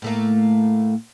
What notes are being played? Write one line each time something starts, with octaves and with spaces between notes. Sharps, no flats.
A2 A3 A#3